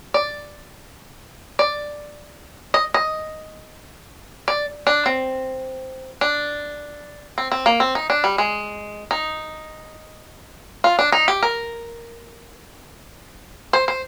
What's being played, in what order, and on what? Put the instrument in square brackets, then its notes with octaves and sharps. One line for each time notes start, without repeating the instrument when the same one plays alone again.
[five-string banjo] D5
D5
D#5
D#5
D5
D4
C4
D4
C4
C4
A#3
C4
D#4
D4
G3
G#3
D#4
F4
D4
D#4
G4
A#4
C5
C5